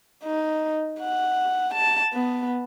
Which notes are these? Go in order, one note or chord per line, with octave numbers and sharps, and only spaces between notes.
D#4
F#5
A5
B3